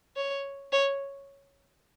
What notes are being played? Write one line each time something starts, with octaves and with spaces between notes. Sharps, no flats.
C#5
C#5